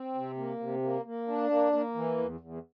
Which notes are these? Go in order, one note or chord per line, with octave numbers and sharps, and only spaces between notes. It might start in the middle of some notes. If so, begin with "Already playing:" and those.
Already playing: C4
C3
A#3
C3
A#3
A#3
D4
A#3
A#3
E3
E2
E2